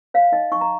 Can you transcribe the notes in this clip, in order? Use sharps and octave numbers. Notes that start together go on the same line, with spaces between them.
C#5 F5
D#4 D#5
D#4 C#6
A#5